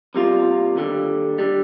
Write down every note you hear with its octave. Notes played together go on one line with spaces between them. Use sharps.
C2 C3 G3 A#3 F4
D#2 D3 G3
D3 G3